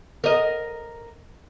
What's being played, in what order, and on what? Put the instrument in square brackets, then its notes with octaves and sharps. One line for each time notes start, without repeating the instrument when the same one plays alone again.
[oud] A#4 D#5